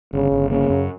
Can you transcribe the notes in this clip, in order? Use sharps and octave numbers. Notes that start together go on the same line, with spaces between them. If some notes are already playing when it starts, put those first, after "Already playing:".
G1 C#3
G1
C#3 A#3
F#2